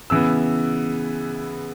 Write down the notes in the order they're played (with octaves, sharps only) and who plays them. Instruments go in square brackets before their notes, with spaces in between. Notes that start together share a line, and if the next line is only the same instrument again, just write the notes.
[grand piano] C#3 E3 B3 E6